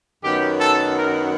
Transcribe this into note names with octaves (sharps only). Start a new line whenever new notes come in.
F#2 D#3 F#3 B3 G4
A4
A#4